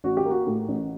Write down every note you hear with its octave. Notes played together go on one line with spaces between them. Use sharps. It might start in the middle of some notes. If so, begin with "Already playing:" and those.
A1 F#4
G4
A#3 F#4
A2
A1